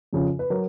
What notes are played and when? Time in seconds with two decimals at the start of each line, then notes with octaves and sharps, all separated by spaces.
0.13 F2 C#3 F3
0.39 B4
0.50 F#3 A#4